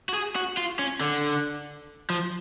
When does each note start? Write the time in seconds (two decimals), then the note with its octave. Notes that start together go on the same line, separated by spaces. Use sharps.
0.09 F#4
0.14 G#4
0.35 F#4
0.57 F4
0.79 C#4
1.01 D3
2.10 F3